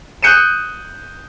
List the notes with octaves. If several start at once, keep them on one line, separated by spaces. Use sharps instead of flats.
D#6 F#6 G6 C#7 D#7 E7